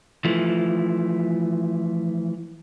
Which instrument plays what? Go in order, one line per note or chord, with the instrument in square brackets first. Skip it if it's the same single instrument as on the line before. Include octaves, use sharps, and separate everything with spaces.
[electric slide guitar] E3 F3 A3